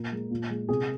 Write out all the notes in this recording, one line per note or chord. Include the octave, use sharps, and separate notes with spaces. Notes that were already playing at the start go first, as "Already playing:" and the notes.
Already playing: A#2 A#4
G#3
A#2
G#3
C3 G#4